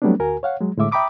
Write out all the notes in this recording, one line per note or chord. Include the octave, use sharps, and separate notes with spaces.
F#3 G3 A3 B3 C4 D4
D2 F#4 A#4 G#5
C#5 F5 F#5
F#3 G#3
A2 D3 G#3 E5 D6
E5 G5 A#5 B5 D6 D#6